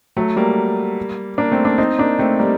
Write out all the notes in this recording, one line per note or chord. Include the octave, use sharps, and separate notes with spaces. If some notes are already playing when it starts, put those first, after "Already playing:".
F#3 A3
G3 A#3
A#3 D4
A3 C4
A#3 D4
C4 D#4
A#3 D4
A3 C4
G3 A#3